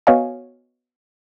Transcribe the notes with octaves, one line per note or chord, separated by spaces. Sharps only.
B3 F#4 C#5 D#5 F5 G#5